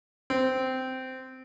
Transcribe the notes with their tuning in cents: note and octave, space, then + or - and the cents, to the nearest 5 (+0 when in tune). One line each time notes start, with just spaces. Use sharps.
C4 -10